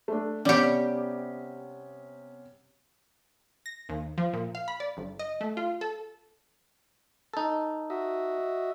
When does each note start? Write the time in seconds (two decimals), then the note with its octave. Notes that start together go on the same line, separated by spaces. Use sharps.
0.08 A3 D4
0.45 C3 G3 B3 C#4 G4
3.66 A#6
3.89 D#2
4.18 F3
4.33 A#2
4.55 F5
4.68 B5
4.80 D5
4.97 G1
5.19 D#5
5.41 A3
5.57 F4
5.81 A4
7.33 D#4 A4
7.90 F#4 D#5 E5